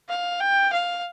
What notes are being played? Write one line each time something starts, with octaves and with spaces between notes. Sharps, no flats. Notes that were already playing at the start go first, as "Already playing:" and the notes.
F5
G5
F5